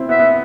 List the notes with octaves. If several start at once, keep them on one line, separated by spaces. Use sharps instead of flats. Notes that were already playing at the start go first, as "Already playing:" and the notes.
Already playing: C4 E4
B3 E5
B3